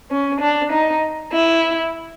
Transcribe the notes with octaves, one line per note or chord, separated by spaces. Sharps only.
C#4
D4
D#4
E4